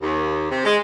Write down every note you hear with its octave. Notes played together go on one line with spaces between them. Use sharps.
D#2
C3
G#3